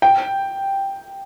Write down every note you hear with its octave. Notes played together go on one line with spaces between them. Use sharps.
G5